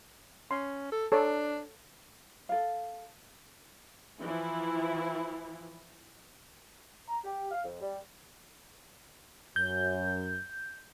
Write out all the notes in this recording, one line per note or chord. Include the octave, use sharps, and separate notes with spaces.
C#4 C6
A4
D4 A4 C#5
A4 F5
E3 F3 E4
A#5
G4
F5
F2
G3
F#2 G6